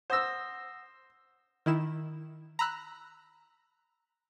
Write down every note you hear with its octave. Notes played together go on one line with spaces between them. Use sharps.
C5 F#5 D#6 E6 A#6
D#3 E4 E7
A#5 B5 E6 F#6